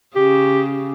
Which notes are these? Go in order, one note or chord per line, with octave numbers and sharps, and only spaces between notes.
C#3 G4